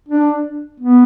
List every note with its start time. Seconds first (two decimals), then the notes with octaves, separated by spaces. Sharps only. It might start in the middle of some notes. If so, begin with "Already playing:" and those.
0.08 D4
0.80 B3